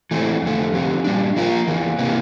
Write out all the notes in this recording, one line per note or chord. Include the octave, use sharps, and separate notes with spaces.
E3 A3 C4
F2 D3 A3
D3 F3 C4 G4
A#2 G3 D4
F3 A#3 F4 A#4
E2 E3 A#3
C3 E3 A#3